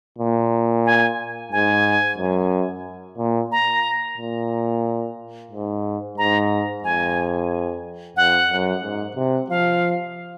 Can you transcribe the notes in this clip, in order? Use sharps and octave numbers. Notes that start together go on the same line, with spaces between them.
A#2
G#5
G#2 G#5
F#2
A#2
A#5
A#2
G#2
G#2 A#5
F2 G#5
F2 F#5
F#2
G#2
C3
F3 F5